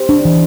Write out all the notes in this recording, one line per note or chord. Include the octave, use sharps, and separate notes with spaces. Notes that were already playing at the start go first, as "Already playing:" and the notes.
Already playing: G4 C5
D4
E3